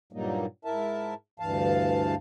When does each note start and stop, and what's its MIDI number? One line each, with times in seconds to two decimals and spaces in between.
0.13 0.46 43
0.13 0.46 46
0.13 0.46 54
0.13 0.46 55
0.13 0.46 58
0.13 0.46 63
0.65 1.14 44
0.65 1.14 64
0.65 1.14 70
0.65 1.14 76
0.65 1.14 81
1.40 2.15 38
1.40 2.15 43
1.40 2.15 52
1.40 2.15 77
1.40 2.15 81